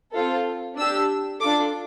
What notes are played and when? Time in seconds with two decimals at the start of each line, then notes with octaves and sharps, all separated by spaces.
0.13 C4 F4 A4
0.76 D4 G4 E6
1.40 D4 F4 A4 D6